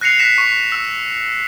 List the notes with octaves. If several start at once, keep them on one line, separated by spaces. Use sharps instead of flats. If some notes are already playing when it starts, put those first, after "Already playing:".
F#6 A#6 C7 C#7 F7
F#6 A#6 B6 C#7 E7
C#6
E6